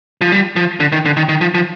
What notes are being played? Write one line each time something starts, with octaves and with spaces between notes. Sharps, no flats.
F3
G3
F3
D3
D#3
D3
D#3
D#3
F3
F3